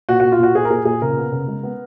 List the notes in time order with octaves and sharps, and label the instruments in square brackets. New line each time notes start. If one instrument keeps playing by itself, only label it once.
[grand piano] A#2 F#4
A#2 F#4
F4
A#2 F#4
A#2 G#4
A#4
A#2 G#4
A#2 G#4
C#3 A#4
B3
C#3
G#3
B3